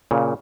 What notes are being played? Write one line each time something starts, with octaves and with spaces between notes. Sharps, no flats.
A#2 C#3